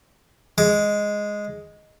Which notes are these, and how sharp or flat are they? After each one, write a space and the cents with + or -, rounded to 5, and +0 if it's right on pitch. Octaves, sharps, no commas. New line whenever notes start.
G#3 +0 D6 -25